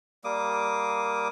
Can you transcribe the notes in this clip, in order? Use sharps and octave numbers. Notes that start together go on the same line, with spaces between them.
G3 A#3 D6 D#6